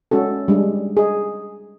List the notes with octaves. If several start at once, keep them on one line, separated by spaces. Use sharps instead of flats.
G#3 C#4 F#4 A4
G3 G#3 D4 G#4
G#4 D#5